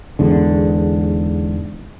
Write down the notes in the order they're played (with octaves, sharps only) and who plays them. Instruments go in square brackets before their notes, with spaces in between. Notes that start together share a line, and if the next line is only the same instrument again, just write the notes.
[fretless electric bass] E2 G#2 D3